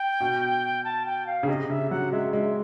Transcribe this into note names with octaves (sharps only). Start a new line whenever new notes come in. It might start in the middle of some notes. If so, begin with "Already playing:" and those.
Already playing: G5
B2
A5
G5
F5
C#3
C3 D#5
C#3 E5
F#3 F#5
G#3 E5
G#3 E5